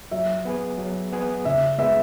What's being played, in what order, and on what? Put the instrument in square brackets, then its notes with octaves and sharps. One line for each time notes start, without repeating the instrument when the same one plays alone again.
[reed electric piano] F#3 [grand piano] E5
[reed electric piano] B3 G#4 B4
F#3
B3 G#4 B4
[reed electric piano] C#3 [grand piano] E5
[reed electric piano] G#3 B3 [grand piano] E5